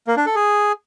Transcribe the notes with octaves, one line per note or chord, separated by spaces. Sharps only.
A#3
D4
A4
G#4